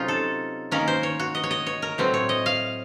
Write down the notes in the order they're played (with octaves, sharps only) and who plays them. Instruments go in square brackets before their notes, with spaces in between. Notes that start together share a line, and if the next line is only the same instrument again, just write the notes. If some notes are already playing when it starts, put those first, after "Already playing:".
Already playing: [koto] C3 F#3 A3 C#4 D#4 F4
A4
D#3 A#3 C#4 A#4
C5
C#5
F#4
D#5
C#5
D#5
C#5
A#4
A2 F#3 C4
C#5
D#5
F5